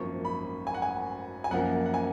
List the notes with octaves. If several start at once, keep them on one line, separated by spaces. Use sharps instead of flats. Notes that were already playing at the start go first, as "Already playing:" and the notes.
Already playing: G#1 F#2 F3 A#3 C#6
B5
G#5
F#5
G#5
G#5
F#2 F3 A#3 F#5
F#5
G#5